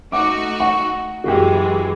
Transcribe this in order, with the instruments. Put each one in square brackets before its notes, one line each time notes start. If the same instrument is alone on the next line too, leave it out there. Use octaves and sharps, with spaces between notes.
[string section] A3 D#4 F#4 [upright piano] F#5 D6
[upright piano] F#5 C#6
[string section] F#2 E3 G#3 [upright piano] F#4 G4